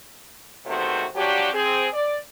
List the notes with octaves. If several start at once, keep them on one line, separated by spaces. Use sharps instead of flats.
E2 C3 D#3 A3 F#4 C5
F3 F#3 D4 F#4 G4
C4 G#4
D5